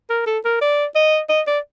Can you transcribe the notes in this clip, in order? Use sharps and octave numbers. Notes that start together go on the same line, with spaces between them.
A#4
A4
A#4
D5
D#5
D#5
D5